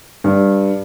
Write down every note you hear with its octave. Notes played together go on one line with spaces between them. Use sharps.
G2